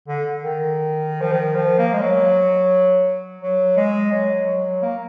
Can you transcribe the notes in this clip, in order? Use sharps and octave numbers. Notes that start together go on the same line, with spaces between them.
D3
D#3
F3
D#3
F3
A#3
G#3
F#3
F#3
G#3
F#3
F#3
A#3